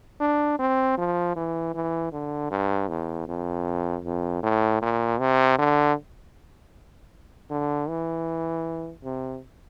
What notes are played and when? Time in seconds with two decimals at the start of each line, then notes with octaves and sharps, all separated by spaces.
0.20 D4
0.59 C4
0.98 F3
1.36 E3
1.74 E3
2.12 D3
2.51 G2
2.89 E2
3.28 F2
4.04 F2
4.43 A2
4.82 A#2
5.20 C3
5.58 D3
7.50 D3
7.88 E3
9.04 C3